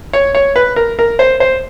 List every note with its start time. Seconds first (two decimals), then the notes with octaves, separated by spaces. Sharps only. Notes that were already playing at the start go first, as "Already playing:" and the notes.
0.13 C#5
0.35 C#5
0.56 B4
0.76 A#4
0.99 A#4
1.19 C5
1.40 C5